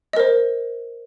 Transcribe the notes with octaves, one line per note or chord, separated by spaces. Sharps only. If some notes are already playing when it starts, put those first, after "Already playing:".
A#4 C5 D#5